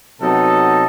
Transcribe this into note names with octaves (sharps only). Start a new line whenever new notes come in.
C3 F#3 B3 D#4 A4